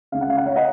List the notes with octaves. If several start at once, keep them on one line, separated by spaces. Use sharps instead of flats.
C#2 C#3 F5
F#5
F5
F#5
C#5 F5
D#5 F#5